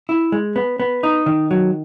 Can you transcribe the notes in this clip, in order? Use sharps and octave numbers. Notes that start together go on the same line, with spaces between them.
E4
G#3
B3
B3
D#4
D#3
F#3